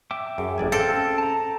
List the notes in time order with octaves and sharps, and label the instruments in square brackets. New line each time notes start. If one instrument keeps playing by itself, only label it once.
[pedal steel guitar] E5 G5 D6
[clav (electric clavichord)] F#2 [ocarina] G#4
[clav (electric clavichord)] A1 D5 G#5
[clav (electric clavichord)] C4 [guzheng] A4 [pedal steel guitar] F5 G5
[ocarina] C#4
[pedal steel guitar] A5 A#5